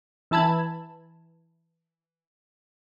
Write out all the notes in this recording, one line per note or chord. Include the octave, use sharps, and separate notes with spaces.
E3 E4 A5 B5 G#6